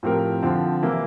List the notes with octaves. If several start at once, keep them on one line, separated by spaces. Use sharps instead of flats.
A2 F3 C4 G4 A#4
D3 F3 C4
C3 E3 A#3 E4